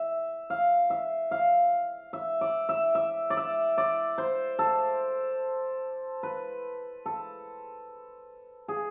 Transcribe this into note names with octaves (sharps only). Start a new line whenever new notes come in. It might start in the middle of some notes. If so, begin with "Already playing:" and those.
Already playing: E5
F5
E5
F5
E5
D5
E5
E5
D5
E5
D5
C5
A4
B4
A4
G#4